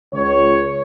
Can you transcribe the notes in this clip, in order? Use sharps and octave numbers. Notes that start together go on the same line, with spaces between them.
C#2 C#5